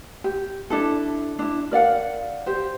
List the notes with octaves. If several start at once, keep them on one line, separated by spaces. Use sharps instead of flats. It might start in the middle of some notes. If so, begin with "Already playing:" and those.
G4
D4 E4 A4
D4 E4
A#4 D5 F5 F#5
G4 C5